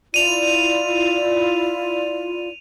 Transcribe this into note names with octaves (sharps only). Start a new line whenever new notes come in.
E4 F4 D5 D#7 F7